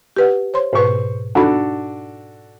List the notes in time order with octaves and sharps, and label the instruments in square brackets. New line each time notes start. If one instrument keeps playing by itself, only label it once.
[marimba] G4 B4 F#5
C5 C#5 C6
[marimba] G#2 B2 B4 [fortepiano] C5 C#6
[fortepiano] D4 F#4 A4 [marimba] D#4 B5